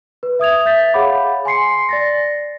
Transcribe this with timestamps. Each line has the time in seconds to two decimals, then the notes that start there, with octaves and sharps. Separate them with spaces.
0.23 B4
0.39 E5 D#6 G#6 F7
0.65 E5 G6 A6 B6
0.94 G#4 C#5 F5 F#5 B5 D6
1.45 G#5 C6 C7 C#7
1.89 D5 A6 A#6